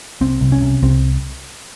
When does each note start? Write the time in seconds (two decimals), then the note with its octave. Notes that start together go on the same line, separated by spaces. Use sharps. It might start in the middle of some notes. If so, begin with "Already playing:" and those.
0.21 C2 C4
0.41 C2
0.52 C#4
0.62 C3
0.82 C2 C4